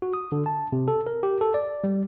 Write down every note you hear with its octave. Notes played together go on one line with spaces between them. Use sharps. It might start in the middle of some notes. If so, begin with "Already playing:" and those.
F#4
D#6
D3
A5
C3
A4
A#4
G4
A4
D5
G3